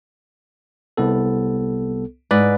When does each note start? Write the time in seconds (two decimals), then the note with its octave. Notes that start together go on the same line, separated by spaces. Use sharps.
0.97 C2 B3 A4
2.31 G#2 B4 D5 B5